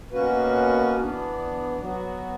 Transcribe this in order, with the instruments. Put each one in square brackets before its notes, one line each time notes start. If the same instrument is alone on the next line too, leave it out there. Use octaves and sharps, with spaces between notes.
[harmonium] B2 A#3 C#4 F#4 B4
E3 B3 D4
F#3 B3 F#4